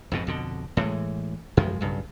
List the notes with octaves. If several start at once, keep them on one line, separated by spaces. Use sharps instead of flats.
F2 G#2 B2
F2 B2 D3
A2 E3 F#3 G#3
F#2 F3 G#3
B1 G2 C#3